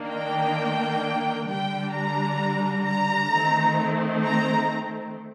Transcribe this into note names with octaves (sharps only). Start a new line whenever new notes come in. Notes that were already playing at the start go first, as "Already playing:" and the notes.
Already playing: D#3 A#3 D4
G5
D3 G3 D4 G5
A#5
A#5
D#3 A3 C4
A#5